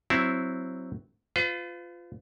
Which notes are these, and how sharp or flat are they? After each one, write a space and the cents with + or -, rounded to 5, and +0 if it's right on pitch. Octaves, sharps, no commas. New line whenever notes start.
F#3 +0 C4 +0 E4 +0
F4 +0 B4 +45